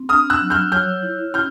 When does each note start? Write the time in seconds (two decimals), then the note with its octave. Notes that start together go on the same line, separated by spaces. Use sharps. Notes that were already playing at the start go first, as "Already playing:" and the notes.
Already playing: C4
0.09 D4 D#6 F6
0.30 E6 F#6
0.41 F#3
0.50 F6 G6
0.72 C#5 F6 G6
1.03 E4
1.34 C#4 F6 G6